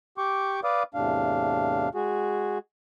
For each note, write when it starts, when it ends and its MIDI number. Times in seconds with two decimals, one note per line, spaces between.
0.18 0.60 67
0.18 0.60 79
0.18 0.60 85
0.18 0.60 86
0.64 0.83 71
0.64 0.83 74
0.64 0.83 77
0.64 0.83 86
0.64 0.83 87
0.94 1.89 40
0.94 1.89 45
0.94 1.89 48
0.94 1.89 62
0.94 1.89 77
1.95 2.58 56
1.95 2.58 66
1.95 2.58 68